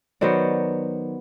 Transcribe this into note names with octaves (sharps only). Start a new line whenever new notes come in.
D#3 F#3 B3 C5 D5